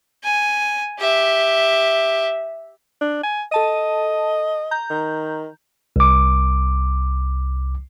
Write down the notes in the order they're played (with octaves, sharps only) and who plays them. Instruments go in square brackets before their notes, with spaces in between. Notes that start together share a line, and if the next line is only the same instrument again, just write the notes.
[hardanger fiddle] G#5
G4 E5
[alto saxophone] D4
G#5
[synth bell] A4 A5 D#7 [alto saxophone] D#5
[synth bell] A#5 G6
[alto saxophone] D#3
[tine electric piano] C2 D6